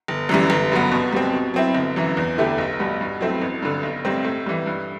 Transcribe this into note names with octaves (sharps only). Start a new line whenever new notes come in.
G1
F#2 E3 G3
G1
G2 F#3 B3
B2
G3 C4
B2
F#3 C4 E4
G1
F#2 E3
E2
D3 A3 E4 G4
B1
B2 G3 B3
G2
F#3 A3 C4 E4
A1
G2 D3
B1
A2 G3 C4
A2
E3 G3
G2